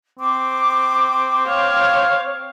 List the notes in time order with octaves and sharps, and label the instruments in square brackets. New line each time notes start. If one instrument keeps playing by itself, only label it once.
[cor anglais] C4 [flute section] D6
[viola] C#5 [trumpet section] F5